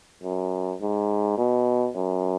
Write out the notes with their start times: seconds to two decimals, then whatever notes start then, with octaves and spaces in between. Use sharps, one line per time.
0.23 F#2
0.81 G#2
1.38 B2
1.95 F#2